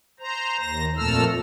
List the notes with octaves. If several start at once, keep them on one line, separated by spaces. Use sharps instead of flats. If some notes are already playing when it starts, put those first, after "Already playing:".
C5 A#5
D#2 A#6
F2 A#2 A3 A4 E6 F6